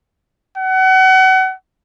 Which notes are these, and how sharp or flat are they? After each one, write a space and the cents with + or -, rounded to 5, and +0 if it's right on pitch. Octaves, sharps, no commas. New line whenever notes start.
F#5 +30